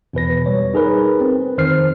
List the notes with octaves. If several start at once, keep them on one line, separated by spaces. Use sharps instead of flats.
E2 B2 B4 A#6
C2 G3 C#5
D#4 G#4 A#4 B4
C4
F2 D#3 C5 F6 C7